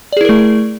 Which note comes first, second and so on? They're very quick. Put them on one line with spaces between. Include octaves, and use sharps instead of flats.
D5 G#4 E4 A#4 A3